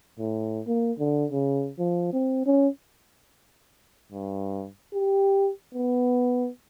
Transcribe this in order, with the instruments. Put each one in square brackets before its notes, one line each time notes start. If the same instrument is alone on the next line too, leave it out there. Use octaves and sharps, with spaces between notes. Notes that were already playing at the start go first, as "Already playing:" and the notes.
[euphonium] A2
A#3
D3
C#3
F3
C4
C#4
G2
G4
B3